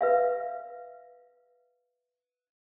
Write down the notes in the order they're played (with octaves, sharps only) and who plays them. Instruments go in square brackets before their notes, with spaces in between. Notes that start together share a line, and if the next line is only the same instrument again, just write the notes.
[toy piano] B4 E5 F5